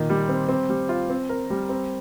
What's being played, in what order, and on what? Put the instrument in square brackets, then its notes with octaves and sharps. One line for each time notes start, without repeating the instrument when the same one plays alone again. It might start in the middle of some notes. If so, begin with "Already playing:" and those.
Already playing: [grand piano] A#2 D#3
G3
C4
C4
G3
F4
C4
A#4
G3
C4